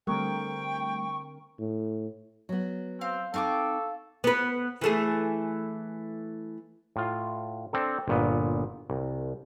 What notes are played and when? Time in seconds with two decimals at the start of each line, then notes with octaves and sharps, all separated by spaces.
0.07 D3 G3 A3 C4 A#4 G5 C#6
1.59 A2
2.49 F#3 B3
3.01 C4 F5
3.34 C4 D#4 A4 F5 G5 C#6 D6
4.24 B3 B4
4.81 E3 A3 G#4
6.96 A2 F4
7.73 C4 D4 A4
8.08 G1 A#2 B3
8.90 C2